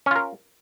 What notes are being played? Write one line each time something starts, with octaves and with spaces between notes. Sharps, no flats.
C#4 F4 A#4